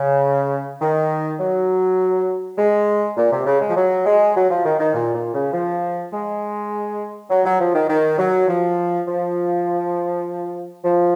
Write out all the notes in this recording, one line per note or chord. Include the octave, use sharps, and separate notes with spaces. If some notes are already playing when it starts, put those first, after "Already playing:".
Already playing: C#3
D#3
F#3
G#3
A#2
C3
C#3
G#3
F3
F#3
G#3
F#3
F3
D#3
D#3
A#2
A#2
C#3
F3
G#3
F#3
F#3
F3
D#3
D#3
F#3
F3
F3
F3